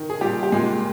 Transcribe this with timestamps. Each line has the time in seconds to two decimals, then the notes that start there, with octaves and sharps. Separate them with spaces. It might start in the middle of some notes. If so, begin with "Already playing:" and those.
Already playing: D#3
0.10 G#4
0.21 A#2 G3 G4
0.43 G4
0.52 A#2 G#3 G#4